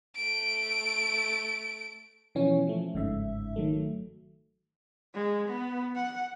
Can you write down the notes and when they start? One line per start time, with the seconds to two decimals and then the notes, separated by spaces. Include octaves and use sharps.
0.16 A3 D7
2.35 B2 E3 F3 C#4 C#5
2.67 F3 A3
2.94 G1 G#2 C#3 E5
3.56 D#3 F#3 A3
5.14 G#3
5.48 B3
5.96 F#5